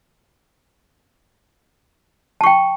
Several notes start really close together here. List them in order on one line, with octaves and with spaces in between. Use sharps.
A5 C#6 G5